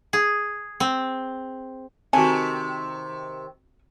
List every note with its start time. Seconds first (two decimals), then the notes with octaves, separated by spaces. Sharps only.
0.13 G#4
0.80 C4
2.13 C3 D#3 C4 F#4 A4 G#5